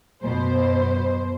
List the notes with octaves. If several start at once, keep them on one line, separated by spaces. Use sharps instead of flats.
F#2 B2 C5